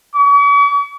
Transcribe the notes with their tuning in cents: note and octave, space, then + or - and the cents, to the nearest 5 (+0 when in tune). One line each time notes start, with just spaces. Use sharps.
C#6 +45